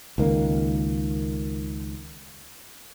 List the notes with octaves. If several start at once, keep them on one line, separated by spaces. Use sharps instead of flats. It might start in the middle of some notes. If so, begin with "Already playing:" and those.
C#2 D#3 A#3